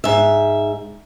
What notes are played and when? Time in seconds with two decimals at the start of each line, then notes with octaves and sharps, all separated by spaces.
0.04 G#2 E5